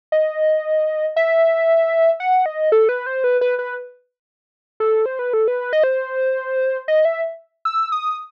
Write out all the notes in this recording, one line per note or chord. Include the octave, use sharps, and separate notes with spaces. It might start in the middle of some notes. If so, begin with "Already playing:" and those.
D#5
E5
F#5
D#5
A4
B4
C5
B4
B4
B4
A4
C5
B4
A4
B4
D#5
C5
D#5
E5
E6
D#6